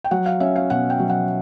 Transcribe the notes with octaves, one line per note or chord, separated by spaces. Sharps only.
G5
F#3 F#5
F5
C#4 E5
F5
B2 F#5
G5
F#3
F#5